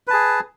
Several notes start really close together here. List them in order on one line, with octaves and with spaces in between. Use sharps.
B4 A5 G#4